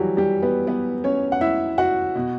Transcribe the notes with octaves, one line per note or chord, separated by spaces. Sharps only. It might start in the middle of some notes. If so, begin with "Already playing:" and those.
Already playing: E3 F#3 G3 E4 F#4 G4
G3 G4
B3 B4
B3 B4
C#4 C#5
F#5
E4 E5
F#4 F#5
B2